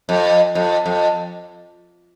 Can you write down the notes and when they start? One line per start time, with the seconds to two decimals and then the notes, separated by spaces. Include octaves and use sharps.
0.09 F2
0.55 F2
0.86 F2